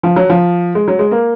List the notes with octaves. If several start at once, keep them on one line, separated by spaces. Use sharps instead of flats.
F3
F#3
F3
G#3
F#3
G#3
A#3